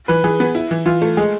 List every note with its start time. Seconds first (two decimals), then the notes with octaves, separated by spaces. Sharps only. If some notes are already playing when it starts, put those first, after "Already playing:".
0.08 E3 B4
0.24 E3 G#4
0.40 B3
0.55 E4
0.71 E3
0.86 E3 F4
1.02 A3
1.17 G#3 G#4